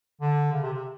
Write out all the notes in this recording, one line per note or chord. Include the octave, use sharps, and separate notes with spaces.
D3
C#3
C3
C3